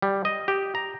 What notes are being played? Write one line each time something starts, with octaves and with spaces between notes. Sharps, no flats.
G3
D#5
G4
A#5